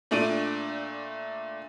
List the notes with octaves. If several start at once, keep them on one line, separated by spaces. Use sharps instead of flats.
A#2 A3 D4 D7 D#7